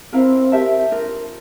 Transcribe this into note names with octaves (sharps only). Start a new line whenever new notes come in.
C4 E4 A#4 F5 A#5
G4 A#4 E5 A5
D4 F4 A#4